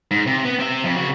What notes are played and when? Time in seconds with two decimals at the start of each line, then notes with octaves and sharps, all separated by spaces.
0.11 G#2
0.27 C3
0.45 B3
0.59 C4 E5
0.84 F2
0.96 C#3 F#4